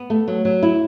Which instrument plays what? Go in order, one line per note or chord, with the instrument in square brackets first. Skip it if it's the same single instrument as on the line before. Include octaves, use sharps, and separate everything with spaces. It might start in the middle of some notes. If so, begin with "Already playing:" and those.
Already playing: [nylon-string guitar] B3
A3
F#3
F#3
E4